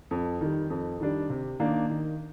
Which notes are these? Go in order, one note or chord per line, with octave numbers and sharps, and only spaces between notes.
F2
D#3 G3
F2
D#3 G3 D4
C3
D#3 A#3 D4
D#3